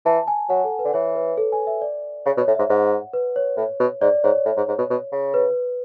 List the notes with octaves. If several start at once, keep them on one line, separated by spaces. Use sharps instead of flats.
E3 A5
G#5
F#3 F#5
A4
B4
D3
E3 C#5
B4
A4
G#5
E5
D5
C#3 C#5
B2
C#5
A2
G#2 E5
G#2 F#5
B4
C#5
A2
B2
G#2 D5
G#2 C#5
A2
G#2
G#2
B2
B2
C#3
B4